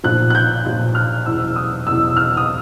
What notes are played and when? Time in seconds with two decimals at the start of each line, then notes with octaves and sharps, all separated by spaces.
0.04 B1 A#2 F3 F#6
0.30 F#6
0.35 G6
0.65 B1 A#2 F3 G6
0.95 F6
1.26 F#1 E2 B2 E6
1.56 D#6
1.87 F#1 E2 B2 E6
2.17 F6
2.37 D#6